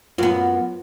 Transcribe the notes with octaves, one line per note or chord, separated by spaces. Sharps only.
F#2 B3 F4